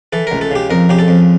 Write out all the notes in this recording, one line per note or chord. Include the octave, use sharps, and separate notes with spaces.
E3 A4
C#2 A#4
A4
C#3 G4
F2 A#4
C#3 G4
A4
F2